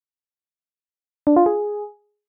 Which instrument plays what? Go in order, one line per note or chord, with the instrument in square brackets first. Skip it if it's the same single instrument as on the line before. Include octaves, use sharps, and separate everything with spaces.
[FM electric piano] D4
F4
G#4